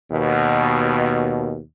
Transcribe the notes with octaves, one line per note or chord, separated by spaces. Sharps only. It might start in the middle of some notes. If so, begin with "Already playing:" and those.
D#2 B2